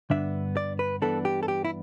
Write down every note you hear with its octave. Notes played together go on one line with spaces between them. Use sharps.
G2 D3 B3 D4 E5
D5
B4
G2 E3 B3 D4 A4
G4
A4
G4
E4